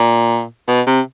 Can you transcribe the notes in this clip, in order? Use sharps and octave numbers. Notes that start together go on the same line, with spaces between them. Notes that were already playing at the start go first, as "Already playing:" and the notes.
Already playing: A#2
B2
C3